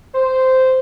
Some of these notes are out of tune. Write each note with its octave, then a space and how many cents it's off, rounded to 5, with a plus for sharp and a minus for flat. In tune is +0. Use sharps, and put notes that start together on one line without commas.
C5 -10